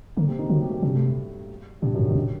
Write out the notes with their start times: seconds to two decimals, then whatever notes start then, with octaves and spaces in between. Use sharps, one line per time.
0.16 A#2 D3 A#3
0.27 C3 C4
0.39 D#3 D#4
0.49 D3 F#3 F#4
0.60 G3 G4
0.67 A3
0.71 A#2 A#3
0.82 G2 C3 G3
0.94 A2 A3
1.06 A2 A3
1.82 G2 A#2 G3
1.94 F#2 F#3
1.99 G2
2.05 D#3
2.11 G2
2.15 A2 D3